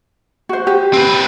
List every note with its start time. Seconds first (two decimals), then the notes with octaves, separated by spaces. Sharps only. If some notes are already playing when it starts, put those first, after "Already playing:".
0.49 F#4 C5
0.67 G4
0.94 C4 B4